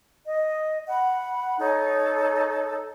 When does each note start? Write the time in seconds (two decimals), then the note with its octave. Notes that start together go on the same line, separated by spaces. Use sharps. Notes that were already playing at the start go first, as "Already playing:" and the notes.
0.25 D#5
0.87 F#5 B5
1.58 D#4 A4 C#5